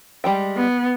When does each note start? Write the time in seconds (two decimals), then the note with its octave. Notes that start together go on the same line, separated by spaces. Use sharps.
0.24 G3 G#3 G5
0.56 B3